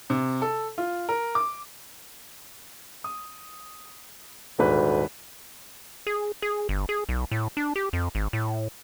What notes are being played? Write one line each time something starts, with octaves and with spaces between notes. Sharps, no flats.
C3
A4
F4
A#4
D6
D#6
D#1 D2 G#2 B4
G#4
G#4
G1
G#4
B1
A2
D4
G4
F2
G#1
A2